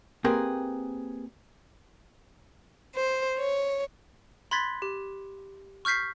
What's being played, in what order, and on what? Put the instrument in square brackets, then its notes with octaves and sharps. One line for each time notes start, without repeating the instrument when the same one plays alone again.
[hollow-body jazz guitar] A#3 C4 G4 G#4 A#4 B4
[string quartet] C5
C#5
[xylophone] B5 C6 F#6 G#6 A6 B6
G4
C#6 F6 G6 B6 C7